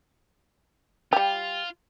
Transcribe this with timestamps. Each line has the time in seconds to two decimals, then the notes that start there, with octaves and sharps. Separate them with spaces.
1.13 G3 F4 G4